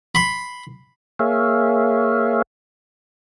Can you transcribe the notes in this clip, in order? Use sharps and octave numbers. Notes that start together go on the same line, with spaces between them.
B5 C6
A#3 G#4 C#5 E5 F5